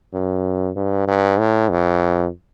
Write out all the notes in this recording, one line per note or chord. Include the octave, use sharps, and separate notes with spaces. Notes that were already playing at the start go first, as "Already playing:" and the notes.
F#2
G2
G2
A2
F2